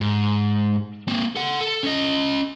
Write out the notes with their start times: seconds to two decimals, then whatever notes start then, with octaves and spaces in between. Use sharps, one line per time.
0.01 G#2
1.08 A#3 C4
1.36 A4 F#5
1.61 A4
1.83 C#4 D#5